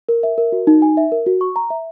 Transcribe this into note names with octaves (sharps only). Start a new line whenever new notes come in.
A#4
E5
A#4
F#4
D#4
G#5
E5
A#4
F#4
C#6
A#5
E5